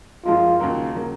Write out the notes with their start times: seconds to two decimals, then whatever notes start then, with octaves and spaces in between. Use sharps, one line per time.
0.25 F#2 F3 G#3 F4
0.60 D#2 C#3 F#3 A#3
0.95 C#3 F#3 A#3